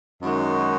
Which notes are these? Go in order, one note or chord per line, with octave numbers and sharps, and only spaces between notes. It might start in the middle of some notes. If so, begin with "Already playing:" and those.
F#2 D#3 G#3 D#4 F#4